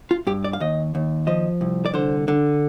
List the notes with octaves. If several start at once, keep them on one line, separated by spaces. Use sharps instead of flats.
F4
G2 G4
D5
F5
D#2 D#5
D#2
F3 D#5
C2
D5
D3 C5
D3